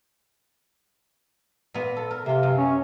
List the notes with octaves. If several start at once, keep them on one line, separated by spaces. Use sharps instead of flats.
A#2 B3
A4
A#4
C3 A#3 F4
F#2
C#4